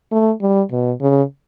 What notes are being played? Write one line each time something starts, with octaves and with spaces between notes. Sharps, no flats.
A3
G3
B2
C#3